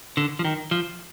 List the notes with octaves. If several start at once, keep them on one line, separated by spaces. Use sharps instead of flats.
D3
F3
D#3
F3